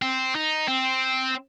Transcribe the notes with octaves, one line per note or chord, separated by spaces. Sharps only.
C4
D#4
C4